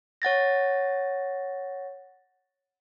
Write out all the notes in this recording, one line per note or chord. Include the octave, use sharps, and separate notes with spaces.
C#5 F#5 A6 A#6